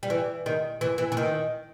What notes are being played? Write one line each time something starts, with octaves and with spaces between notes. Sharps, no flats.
G3
E3
D#3
E3
E3
E3
D#3